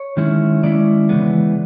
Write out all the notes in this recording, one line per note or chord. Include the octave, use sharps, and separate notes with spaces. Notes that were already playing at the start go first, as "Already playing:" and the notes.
Already playing: C#5
D#3 G#3 C#4 E4
D#3 G#3 C#4 E4 D5
C#3 E3 G#3 B3